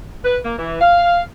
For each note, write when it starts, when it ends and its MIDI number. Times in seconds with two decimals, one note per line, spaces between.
0.24 0.38 71
0.44 0.53 58
0.58 0.79 52
0.81 1.21 77